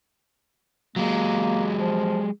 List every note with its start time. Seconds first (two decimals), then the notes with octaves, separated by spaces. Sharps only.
0.96 F#3 G#3 A#3
1.77 F3